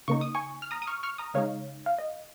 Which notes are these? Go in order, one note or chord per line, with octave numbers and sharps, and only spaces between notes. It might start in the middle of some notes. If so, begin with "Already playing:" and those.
C#3 A#3 D#4 C#6
D#6
G#5 C#6
F6
A#5 D#6
D#6
C#6 F6
C#6 F6
A#5 D#6
C#3 G#3 D#4 C#5 F5
F5
D#5